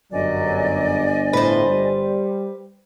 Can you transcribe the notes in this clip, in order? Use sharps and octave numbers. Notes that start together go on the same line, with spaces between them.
G1 F#2 F#3 D5 D#5 G#5
A2 B4 C5
G3